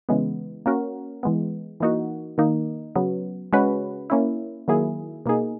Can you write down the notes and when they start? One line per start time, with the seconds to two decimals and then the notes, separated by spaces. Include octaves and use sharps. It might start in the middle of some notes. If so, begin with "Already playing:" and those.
0.09 C#3 E3 G#3 B3
0.66 A#3 C#4 F#4 A#4
1.23 E3 G#3 B3
1.80 E3 A#3 D#4 F#4
2.38 D#3 A#3 D#4
2.96 C#3 F#3 B3
3.53 C#3 G#3 C#4 F#4 B4
4.10 A#3 C#4 E4
4.68 D#3 F#3 A#3 E4 G#4
5.26 B2 A#3 D#4 G#4